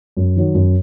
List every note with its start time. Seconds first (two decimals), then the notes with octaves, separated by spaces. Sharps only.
0.17 F#2
0.36 D#3 F#3
0.55 F#2